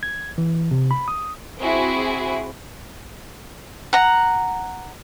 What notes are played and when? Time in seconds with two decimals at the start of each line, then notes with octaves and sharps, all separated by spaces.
0.03 G#6
0.38 E3
0.71 C3
0.91 B5
1.08 D#6
1.60 C4 E4 F#4 G#4
3.93 F#5 A#5